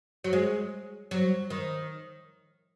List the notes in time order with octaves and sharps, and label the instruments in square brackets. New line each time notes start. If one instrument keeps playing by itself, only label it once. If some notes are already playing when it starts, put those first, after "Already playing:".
[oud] F#3
G#3
F#3
D#3